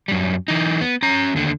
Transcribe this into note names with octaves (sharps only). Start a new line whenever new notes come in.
F#2 G3
E3 D#4
B3
C#4 A#5
D#2 D3